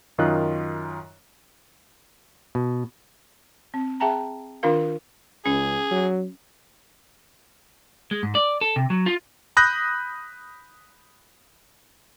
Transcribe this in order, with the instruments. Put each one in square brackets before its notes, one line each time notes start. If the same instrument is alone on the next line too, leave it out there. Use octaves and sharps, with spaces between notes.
[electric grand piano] F#2 D#3 F4 D#5 F#6
[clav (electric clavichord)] B2
[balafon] C4
G#4 E5 G5 A5 A#5
D#3 D4 F4 A#4 F5
[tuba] C#2 [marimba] C#4 [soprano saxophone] G#4
[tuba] F#3
[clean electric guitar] G#3
G#2
D5
A4
C3
F#3
F4
[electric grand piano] B5 D#6 F#6 G6 A#6